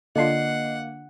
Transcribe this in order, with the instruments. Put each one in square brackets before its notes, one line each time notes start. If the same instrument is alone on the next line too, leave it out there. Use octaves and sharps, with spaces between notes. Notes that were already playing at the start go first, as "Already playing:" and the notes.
[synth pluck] D3 D4 F4 [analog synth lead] A#3 [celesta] D#5 C7 [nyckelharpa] F#5